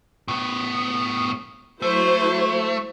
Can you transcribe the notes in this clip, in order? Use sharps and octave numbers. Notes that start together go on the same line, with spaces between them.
A2 B3
F#3 A3 E4 C5